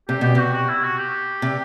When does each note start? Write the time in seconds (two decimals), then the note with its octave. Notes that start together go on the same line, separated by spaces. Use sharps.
0.09 C3 G4
0.21 B2 G4
0.35 C3 F#4
0.53 F#4
0.68 E4
0.83 F#4
0.98 G4
1.42 C3